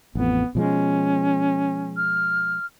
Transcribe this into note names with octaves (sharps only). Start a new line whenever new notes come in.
A1 F2 B3
B2 F3 G#3 C#4
F6